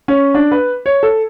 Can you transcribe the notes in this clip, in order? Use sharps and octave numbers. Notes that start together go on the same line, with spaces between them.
C#4
D4
B4
C#5
A4